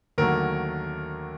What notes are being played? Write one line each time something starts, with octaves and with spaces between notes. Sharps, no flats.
D#2 D3 F#3 A3 A#4